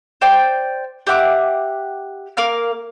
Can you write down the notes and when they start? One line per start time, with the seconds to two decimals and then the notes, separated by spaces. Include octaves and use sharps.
0.21 C5 D5 G5
1.07 G4 E5 F#5 D6
2.37 A#3 A#4 F5 F6